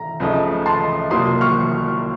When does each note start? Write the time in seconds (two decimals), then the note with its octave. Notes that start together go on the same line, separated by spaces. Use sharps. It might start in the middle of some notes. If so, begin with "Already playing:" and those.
Already playing: A#5
0.20 C#2 C#3 F3 A3 D#4
0.66 A5 C6
1.10 C2 C3 F#3 A#3 F4 C6 D#6
1.41 C#6 F6